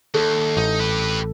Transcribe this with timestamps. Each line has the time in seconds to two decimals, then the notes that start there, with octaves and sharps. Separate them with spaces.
0.14 D#2 A4
0.57 A1 D#4
0.79 G4 B4